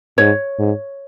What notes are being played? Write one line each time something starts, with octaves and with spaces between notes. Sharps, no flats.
G#2 C#5
G#2